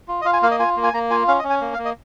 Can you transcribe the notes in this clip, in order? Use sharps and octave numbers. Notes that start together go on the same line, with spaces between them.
F4
D#5
F4 F5
G#5
A#3 F5
D#5
F4 G#5
A#3
G#5
A#3 A#5
F4 G#5
C#4 F5
D#5
C#4
G#5
A#3
F5
A#3
D#5